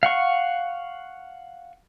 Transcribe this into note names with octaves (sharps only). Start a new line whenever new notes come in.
F5 F#5 C#6